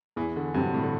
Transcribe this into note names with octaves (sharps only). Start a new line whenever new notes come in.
E2 E3
D3
G2 C3 F#3 C4
A2
D3